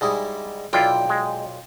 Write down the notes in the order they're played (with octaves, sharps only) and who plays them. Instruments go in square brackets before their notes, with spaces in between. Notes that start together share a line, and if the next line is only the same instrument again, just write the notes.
[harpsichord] G#2 G3 E4 [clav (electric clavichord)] G#4 D#5
[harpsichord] B1 A#2 [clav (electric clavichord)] E4 F4 D5 [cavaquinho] G5
[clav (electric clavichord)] G#3